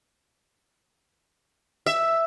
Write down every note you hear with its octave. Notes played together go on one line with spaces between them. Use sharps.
E5